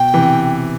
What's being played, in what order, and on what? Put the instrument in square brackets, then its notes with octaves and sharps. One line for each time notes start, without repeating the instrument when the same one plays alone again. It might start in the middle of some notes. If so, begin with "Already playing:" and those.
Already playing: [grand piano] B2 [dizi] G5
[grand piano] C3 E3